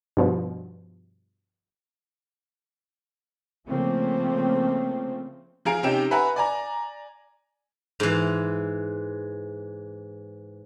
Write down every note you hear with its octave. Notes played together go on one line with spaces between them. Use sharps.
G2 B2 F3
C#3 F3 A3 A#3 C4
F3 G#4 F5 A#5 D7
C3 C#4 D#4 G5 E7
B4 E5 F#5 G#5 A#5 B5
D5 G#5 A#5
G#2 E3